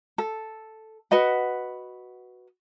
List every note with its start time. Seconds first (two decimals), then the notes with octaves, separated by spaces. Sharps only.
0.18 A4
1.11 F#4 B4 D#5 F#5